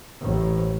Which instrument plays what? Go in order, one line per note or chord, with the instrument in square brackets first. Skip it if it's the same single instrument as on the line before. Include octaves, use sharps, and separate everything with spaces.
[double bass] A1